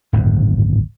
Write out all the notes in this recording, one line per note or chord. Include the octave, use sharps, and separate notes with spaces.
D1 G#1 F#2 A#2